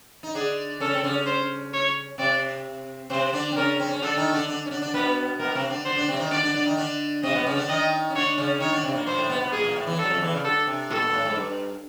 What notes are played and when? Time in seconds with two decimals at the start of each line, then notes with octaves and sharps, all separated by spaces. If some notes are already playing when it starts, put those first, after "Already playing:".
0.23 D#4
0.35 D3 D4 G#4
0.80 C#3 C#4 A4
0.94 C4
1.03 C#3 C#4
1.26 C5
1.73 C#5
2.18 C3 C4 D5
3.10 C3 C4 C5
3.33 D3 D4
3.52 C4
3.56 C#3 C#4 A#4
3.79 C4
3.91 C#4
4.02 D3 D4 A4
4.17 D#3 D#4
4.32 D3 D4
4.48 D3 D4
4.66 C#4
4.71 D3 D4
4.82 D3 D4
4.94 B2 B3 B4
5.40 B2 B3 A#4
5.55 C3 C4
5.70 D3 D4
5.85 D3 D4 C5
5.96 D3 D4
6.08 C3 C4
6.15 D4
6.20 D#3 D#4
6.31 D3 D4 D5
6.43 D3 D4
6.54 D3 D4
6.66 D#3 D#4
6.77 D3 D4
7.23 C3 C4 D#5
7.35 B2 B3
7.46 C#3 C#4
7.57 D3 D4
7.69 D#3 D#4 D#5
8.10 C#4
8.15 D3 D4 C#5
8.38 C#3 C#4
8.60 D#3 D#4 C#5
8.72 D3 D4
8.84 C3 C4
8.95 A#2 A#3
9.06 A#2 A#3 C5
9.18 A2 A3
9.30 B2 B3
9.41 B2 B3
9.52 A#2 A#3 G#4
9.64 A#2 A#3
9.76 A2 A3
9.87 E2 E3
9.99 F#3 A4
10.10 F2 F3
10.21 E2 E3
10.33 C#3
10.44 D3 A4
10.67 C3
10.90 A#2 A4
10.97 B2
11.02 A#2
11.14 A2
11.25 G#2
11.36 G2